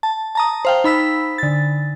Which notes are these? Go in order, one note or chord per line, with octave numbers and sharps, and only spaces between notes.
A5
A5 A#5 D#6
C5 F5 G5
D#4 B5 E6 B6
D3 A6